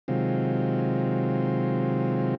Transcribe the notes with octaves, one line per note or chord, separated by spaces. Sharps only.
C3 D#3 F#3 G#3 C4 F4